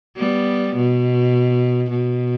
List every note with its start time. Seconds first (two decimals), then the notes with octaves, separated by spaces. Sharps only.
0.17 G3 B3
0.75 B2
1.90 B2